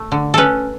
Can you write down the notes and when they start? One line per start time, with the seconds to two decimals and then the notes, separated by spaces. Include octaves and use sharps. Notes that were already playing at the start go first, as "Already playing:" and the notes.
Already playing: A3
0.12 D3
0.34 C#4 A4 B4